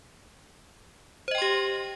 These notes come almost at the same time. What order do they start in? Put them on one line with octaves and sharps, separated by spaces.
C5 D#5 G5 C6 G4